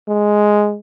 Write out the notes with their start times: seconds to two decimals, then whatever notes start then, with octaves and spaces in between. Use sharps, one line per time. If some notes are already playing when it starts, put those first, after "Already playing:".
0.08 G#3